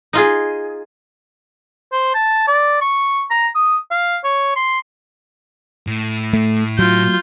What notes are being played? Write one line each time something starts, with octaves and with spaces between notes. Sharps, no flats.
D#4 F4 G#4
C5
A5
D5
C#6
A#5
D#6
F5
C#5
C6
A2
A3
F#3 F4 G6